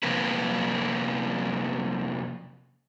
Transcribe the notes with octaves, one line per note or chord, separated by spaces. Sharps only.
C3 F3 A#3 A#4 B4